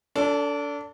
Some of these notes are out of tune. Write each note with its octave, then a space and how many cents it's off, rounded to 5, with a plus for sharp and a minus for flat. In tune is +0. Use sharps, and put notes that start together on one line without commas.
D4 -30 A4 +20